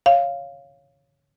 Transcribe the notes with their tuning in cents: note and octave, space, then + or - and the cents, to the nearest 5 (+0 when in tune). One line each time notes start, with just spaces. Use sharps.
C#5 +0 F5 -5